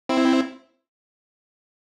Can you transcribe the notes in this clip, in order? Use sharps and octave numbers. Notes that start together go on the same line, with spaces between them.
C4 E4